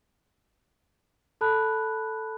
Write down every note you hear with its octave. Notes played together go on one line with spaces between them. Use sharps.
A4 A5 B5 F#6